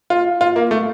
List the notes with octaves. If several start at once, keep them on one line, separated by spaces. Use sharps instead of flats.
F4
F4
A#3
A3